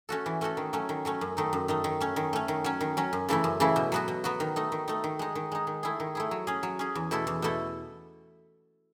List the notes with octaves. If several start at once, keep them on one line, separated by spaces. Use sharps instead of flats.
A3 C#4 F#4 A4
E3
A3 C#4 F#4 A4
D#3
F#3 A3 C#4
D#3
F#3 A3 C#4
F#2
D#3 A3 D#4
F#2
D#3 A3 D#4
D#3
A3 C#4
D#3
A3 C#4
D#3
F#3 C#4
D#3
F#3 C#4
F#2
C#3 E3 A3 E4
F#2
C#3 E3 A3 E4
B2
F#3 B3 F#4
B2
F#3 B3 F#4
D#3
A3 D#4
D#3
A3 D#4
D#3
G#3 D#4
D#3
G#3 D#4
D#3
A3 E4 G#4
D#3
A3 E4 G#4
F#3
C#4 G#4
F#3
C#4 G#4
E2
B2 A3 E4 A4
E2
B2 A3 E4 A4